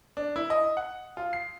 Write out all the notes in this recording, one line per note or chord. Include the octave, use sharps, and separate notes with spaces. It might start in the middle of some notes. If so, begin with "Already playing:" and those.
D4
E4
D#5
F#5
F4
C7